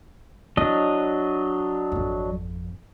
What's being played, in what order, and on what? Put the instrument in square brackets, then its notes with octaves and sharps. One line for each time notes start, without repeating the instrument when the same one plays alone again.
[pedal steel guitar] F#3 D4 D#5 [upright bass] E4
[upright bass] G#1 F2